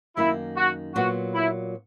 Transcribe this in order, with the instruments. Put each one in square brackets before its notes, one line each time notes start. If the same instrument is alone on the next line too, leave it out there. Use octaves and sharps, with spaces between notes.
[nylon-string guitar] F#2 D#3 A#3 [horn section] E4
[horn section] F#4
[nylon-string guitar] A#2 F#3 B3 [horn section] F#4
[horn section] E4